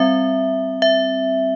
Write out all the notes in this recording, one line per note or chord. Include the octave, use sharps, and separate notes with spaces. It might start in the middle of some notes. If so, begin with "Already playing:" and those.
Already playing: G3 C4 E5
E5